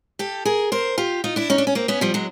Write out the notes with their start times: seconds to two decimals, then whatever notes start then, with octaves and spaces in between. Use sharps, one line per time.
0.19 G4 A4
0.45 G#4 A#4
0.72 A#4 C5
0.98 F4 G4
1.24 D#4 F4
1.36 D4 E4
1.50 C#4 D#4
1.58 D4
1.67 C#4
1.75 A#3 C4
1.88 B3 C#4
2.01 F3 G3
2.14 F#3 G#3